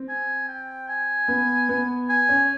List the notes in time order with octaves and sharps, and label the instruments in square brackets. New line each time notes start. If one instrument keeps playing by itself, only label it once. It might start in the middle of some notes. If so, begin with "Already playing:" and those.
Already playing: [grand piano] C4
[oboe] G#5
G5
G#5
[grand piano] B3
B3
[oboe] G#5
[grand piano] C#4